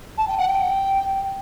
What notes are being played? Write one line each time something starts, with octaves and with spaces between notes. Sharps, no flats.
A5
G5
F#5
G5